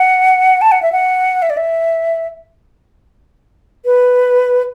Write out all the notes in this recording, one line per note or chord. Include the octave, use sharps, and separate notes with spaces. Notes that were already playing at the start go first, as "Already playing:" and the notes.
Already playing: F#5
A5
F#5
E5
F#5
E5
D5
E5
B4